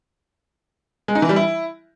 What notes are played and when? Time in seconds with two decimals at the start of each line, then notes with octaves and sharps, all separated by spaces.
1.08 G#3
1.15 D#4
1.22 E3
1.29 G3
1.36 E4